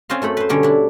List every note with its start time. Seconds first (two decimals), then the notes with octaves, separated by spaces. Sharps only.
0.10 C4 C#4 F4 C5 D#5 F5
0.22 F#2 A3 A4 B5
0.37 B4 C5
0.49 B2 D3 G3 C#4
0.63 D4 E4